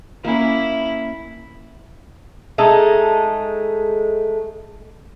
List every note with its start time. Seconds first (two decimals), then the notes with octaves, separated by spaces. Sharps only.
0.25 A#3 C#4 E4
2.58 G#3 A3 D#4 A4